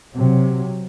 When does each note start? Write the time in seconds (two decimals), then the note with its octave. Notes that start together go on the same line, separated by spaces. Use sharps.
0.14 C3 F#3